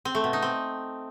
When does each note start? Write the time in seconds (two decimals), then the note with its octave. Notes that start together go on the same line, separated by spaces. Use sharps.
0.05 C4
0.15 A3
0.24 B2
0.33 D#4
0.42 C4